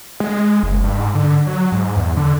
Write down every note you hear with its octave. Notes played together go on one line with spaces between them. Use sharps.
G#3
F#1
G2
G#2
D3
F#3
G#2
E2
D3